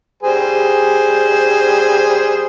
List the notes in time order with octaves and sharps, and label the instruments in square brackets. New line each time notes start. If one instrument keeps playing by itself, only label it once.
[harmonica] G3 G#4 C5